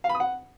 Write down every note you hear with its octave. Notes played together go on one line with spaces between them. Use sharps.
F5
B5
D#6
F#5